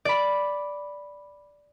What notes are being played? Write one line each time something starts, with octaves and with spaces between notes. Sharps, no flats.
D5 B5